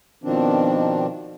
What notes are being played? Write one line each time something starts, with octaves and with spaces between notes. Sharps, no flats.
B2 D#3 F3 C4 D4